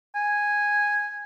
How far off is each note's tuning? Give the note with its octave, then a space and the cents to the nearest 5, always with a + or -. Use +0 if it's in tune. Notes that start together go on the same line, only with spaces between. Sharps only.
G#5 -5